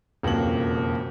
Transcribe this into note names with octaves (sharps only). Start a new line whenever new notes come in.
E1 F2 C#3 F#3 A#3 F#7